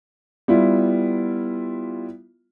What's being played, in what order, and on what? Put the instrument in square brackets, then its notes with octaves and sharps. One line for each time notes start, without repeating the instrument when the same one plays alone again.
[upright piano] G3 B3 E4 F4